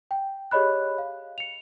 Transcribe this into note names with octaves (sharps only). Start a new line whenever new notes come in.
G5
G4 G#4 C#5 D#5 B5 F#6
F5
C#7 F7